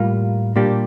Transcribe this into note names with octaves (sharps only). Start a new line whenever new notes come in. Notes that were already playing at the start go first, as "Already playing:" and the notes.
Already playing: A2 G3 A#3 F4
A#2 G3 A#3 D4 G4